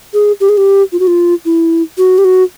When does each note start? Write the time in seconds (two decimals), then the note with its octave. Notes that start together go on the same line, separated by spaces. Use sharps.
0.14 G#4
0.40 G4
0.49 G#4
0.57 G4
0.92 F4
0.99 F#4
1.07 F4
1.45 E4
1.98 F#4
2.18 G4
2.24 F#4